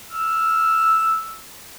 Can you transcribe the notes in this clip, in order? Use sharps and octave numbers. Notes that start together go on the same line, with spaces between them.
E6 F6